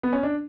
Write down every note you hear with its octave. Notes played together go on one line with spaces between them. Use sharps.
B3
C#4
D4